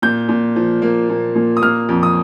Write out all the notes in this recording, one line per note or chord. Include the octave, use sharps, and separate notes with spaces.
A#2 G6
A#2
F3
A#3
A#2
A#2
D#6
A#3 F6
F2
D#6